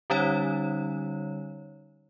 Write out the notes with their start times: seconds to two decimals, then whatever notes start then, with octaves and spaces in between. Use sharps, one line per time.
0.10 D3 G3 C#4 D#4 C#5